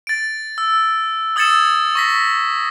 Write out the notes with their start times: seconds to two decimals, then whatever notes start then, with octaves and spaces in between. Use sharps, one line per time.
0.07 A6 D7
0.58 E6
1.36 D#6 E6 G#6 A6 C#7 E7
1.95 C#6 A#6 B6